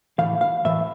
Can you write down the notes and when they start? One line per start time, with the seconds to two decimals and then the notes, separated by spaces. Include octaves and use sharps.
0.19 A2 E3 F5
0.41 F5
0.65 A2 E3 E5